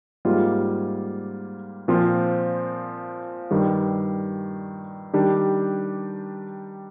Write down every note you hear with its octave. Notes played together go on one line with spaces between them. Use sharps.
G#2 G3 A#3 F4
A#2 F3 C4 F4
G2 D#3 G3
D#3 G3 D4 G4